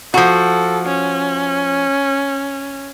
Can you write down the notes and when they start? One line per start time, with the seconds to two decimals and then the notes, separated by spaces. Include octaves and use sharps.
0.14 F3 F#4 A4
0.86 C#4